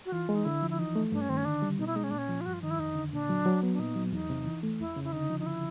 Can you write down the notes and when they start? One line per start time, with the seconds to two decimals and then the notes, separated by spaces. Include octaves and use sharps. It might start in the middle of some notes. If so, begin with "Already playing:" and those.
0.06 F#4
0.12 E3 F4
0.29 G#3
0.35 D#4
0.45 D3 E4
0.62 F3
0.70 E4
0.79 E3 D#4
0.95 A3
1.12 G2 D4
1.21 C#4
1.29 D#3 C4
1.37 C#4
1.45 D3 D4
1.62 G3
1.79 B2 D#4
1.87 E4
1.96 G#3 D#4
2.04 C#4
2.10 A#2 D4
2.18 C#4
2.29 F3
2.41 F4
2.46 G2 F#4
2.53 F4
2.62 D#3 D#4
2.71 E4
2.79 F2 D#4
2.95 D3
3.13 A#2 D4
3.29 F#3
3.46 F#3
3.63 B3
3.73 D4
3.79 A#2 D#4
3.96 F#3
4.12 E2 D#4
4.30 C3
4.46 E3
4.63 A3
4.79 F2 E4
4.96 C#3
5.04 E4
5.12 D3 D#4
5.30 F3
5.40 D#4
5.46 E4